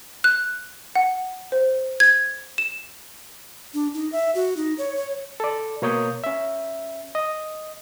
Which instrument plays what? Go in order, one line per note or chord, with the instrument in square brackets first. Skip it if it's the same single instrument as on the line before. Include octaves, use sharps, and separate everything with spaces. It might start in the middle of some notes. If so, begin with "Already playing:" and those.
[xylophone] F#6
F#5
C5
G#6
E7
[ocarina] D4
D#4
E5
F#4
D#4
C#5
C#5
[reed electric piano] A4 D5
B2 A#3 C#5 D#6 G6
C#4 E5
D#5